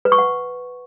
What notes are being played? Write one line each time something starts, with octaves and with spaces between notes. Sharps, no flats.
B4
C#6
F#5